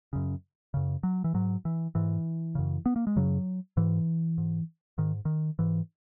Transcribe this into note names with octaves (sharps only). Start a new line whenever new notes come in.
F#2 C#3
F#2 C#3
F#3
E3
G#2 F#3
E3
G#2 E3
F#2 C#3
B3
A#3
G#3
F#2 C#3 F#3
G#2 E3
G#2
G#2 D#3
D#3
G#2 E3